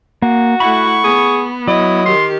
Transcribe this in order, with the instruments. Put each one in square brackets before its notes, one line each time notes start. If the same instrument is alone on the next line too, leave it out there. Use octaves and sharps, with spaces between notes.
[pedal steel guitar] A#3 [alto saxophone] F#4
[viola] A3 E4 [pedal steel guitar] F#5 B5 [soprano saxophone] C#6
[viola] B3 [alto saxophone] G#4
[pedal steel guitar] F#3 [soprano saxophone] E4 [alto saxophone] D#5
[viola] D#3 G4 [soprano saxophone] C6